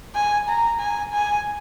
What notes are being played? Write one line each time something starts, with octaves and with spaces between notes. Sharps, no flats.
G#5
A#5
G#5
G#5